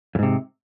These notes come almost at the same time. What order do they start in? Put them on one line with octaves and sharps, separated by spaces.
F2 G#2 C3